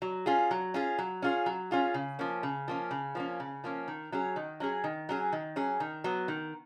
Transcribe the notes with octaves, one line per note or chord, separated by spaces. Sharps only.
F#3
C#4 F4 G#4
F#3
C#4 F4 G#4
F#3
C#4 F4 G#4
F#3
C#4 F4 G#4
C#3
F3 A#3 C#4
C#3
F3 A#3 C#4
C#3
F3 A#3 C#4
C#3
F3 A#3 C#4
D#3
F#3 C#4 G#4
D#3
F#3 C#4 G#4
D#3
F#3 C#4 G#4
D#3
F#3 C#4 G#4
D#3
F#3 B3
D#3